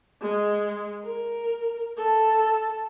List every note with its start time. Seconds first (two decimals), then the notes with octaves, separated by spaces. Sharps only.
0.22 G#3
1.05 A#4
1.98 A4